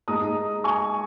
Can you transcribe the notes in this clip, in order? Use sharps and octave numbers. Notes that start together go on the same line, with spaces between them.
G#2 G#3 D#4 A#5 D#6
G#5 C#6